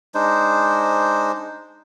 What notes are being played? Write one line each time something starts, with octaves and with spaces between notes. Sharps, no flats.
G#3 D4 D#4 C5